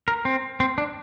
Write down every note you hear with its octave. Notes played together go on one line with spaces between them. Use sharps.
A#4
C4
C4
D4